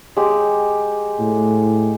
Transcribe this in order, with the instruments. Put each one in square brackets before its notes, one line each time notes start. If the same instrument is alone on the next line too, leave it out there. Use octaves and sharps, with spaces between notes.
[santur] G#3 G4
[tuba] A2